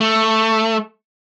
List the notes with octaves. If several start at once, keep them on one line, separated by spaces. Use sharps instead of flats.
A3